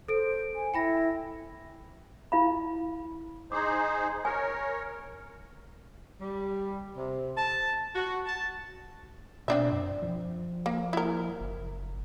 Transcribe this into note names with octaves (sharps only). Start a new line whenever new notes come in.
A4 C5 D7
G#5
E4 G5 B5 A#6
E4 F5 B5
D#4 G#4 C5 D6
A#4 C#5 G#5
G3
C3
A5
F#4
A5
B2 C4 D4 E5
F#2
F3
A#3
E4 A#4
F#1